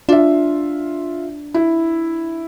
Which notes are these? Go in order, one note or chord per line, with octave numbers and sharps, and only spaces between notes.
D4 F4 E5
E4